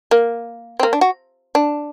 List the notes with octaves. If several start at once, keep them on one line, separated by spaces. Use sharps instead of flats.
A#3
C4
A#3
D4
F#4
D4